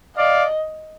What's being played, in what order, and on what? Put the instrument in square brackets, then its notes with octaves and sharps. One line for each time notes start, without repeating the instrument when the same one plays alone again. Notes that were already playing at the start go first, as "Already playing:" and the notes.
[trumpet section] D5 F5 [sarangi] D#5